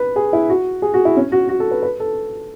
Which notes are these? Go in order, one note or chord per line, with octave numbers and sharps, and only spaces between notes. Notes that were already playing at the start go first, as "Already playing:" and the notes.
Already playing: B4
G#4
E4
F#4
G#4
F#4
E4
C#4
F#4
F#4
A4
B4
B4
A4